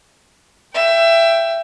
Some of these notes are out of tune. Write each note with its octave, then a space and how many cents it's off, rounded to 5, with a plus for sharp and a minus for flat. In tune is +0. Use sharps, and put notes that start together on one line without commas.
E5 +20 G5 +0